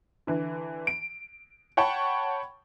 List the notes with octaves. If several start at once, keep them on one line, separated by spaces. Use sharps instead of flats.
D3 E3
D7
C#5 F#5 G5 A5 B5 C#6